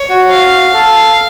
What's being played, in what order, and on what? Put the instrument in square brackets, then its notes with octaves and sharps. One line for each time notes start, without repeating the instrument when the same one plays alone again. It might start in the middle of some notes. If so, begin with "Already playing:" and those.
Already playing: [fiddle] C#5
[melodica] F#4
[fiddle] F5
[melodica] A4